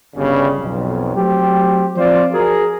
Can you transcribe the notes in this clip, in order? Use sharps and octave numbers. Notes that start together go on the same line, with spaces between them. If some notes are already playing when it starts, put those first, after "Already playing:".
G1 C#3 G3
B1 F2
F#3 A3 C4 G4
F3 C4 F4 C5 D5
F#4 G#4 A#4